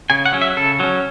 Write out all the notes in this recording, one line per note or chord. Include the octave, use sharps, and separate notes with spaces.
C#3 G#5
F#5
F#3 C#4
E5
C#3 A4
F#3 C#4